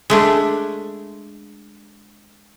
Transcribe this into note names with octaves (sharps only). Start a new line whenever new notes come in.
G#3 A3 D4